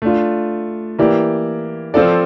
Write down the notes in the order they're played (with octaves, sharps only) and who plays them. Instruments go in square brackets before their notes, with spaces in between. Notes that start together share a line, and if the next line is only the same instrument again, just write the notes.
[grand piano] A3 D4 F4
E3 A#3 E4 G4 D5
F3 C4 F4 A4 D5